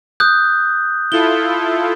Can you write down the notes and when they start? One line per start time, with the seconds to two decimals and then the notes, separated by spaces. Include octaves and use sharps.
0.20 D#6 F#6 G6
1.12 E4 F4 A4 G7